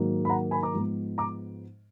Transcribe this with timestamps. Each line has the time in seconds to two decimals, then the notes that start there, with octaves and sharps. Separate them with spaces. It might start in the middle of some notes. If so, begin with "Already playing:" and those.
Already playing: G#2 D#3 F#3 A#3
0.25 B5
0.29 F#5 A#5
0.51 G#5 B5
0.62 A#5 D6
0.74 G#2 F3 G#3 B3
1.18 A#5 D6